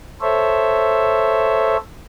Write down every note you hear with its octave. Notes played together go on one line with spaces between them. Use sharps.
A4 C5 C#5 E5